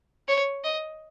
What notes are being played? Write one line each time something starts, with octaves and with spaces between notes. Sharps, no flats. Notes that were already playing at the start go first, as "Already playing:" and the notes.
C#5
D#5